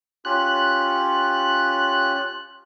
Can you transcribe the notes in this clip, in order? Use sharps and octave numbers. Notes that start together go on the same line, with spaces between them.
C#4 F4 G4 F#6